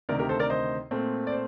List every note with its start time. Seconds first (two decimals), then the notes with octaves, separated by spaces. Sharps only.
0.09 D2 C3 D#3 A#4 D5
0.19 G4 A#4
0.29 A4 C5
0.39 A#4 D5
0.50 C5 D#5
0.91 A#2 A3 C4
1.27 D5
1.32 C5